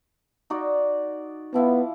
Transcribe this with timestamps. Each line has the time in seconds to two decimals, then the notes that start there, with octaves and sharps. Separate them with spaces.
0.50 D#4 F#4 D5
1.54 F3 B3 E4 F5